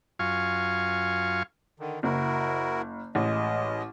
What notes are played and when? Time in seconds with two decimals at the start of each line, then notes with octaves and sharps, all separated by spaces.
0.19 F#2 F4 F5 G#5 C#6
1.80 D3 D#3
2.03 F#1 E4 F#4 A#4
3.15 A1 G#3 D#5